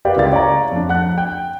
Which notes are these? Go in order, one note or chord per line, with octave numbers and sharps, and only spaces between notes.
G4 A#4 B4 D5 F5 G5
C#2 E4 F5 A6
C#5 D5 F5 A#5
F2 D4
F#5 F#6
G5